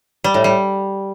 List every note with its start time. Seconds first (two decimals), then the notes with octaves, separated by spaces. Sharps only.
0.24 G3
0.34 A2
0.44 G3